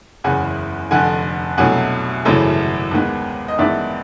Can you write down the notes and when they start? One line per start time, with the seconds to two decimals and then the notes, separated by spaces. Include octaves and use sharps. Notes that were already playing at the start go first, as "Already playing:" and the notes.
0.24 F#1 E2 C#3 E3 F#5 G#5
0.91 F1 F2 D3 F#5 G#5
1.58 C2 B2 F#3 A3 D4 F#5 G#5
2.25 G#1 F#2 C#3 E3 A3
2.91 D#2 D#3 G#3 B3
3.48 D#5
3.58 A1 G2 D#3 G#3 B3 D5 E5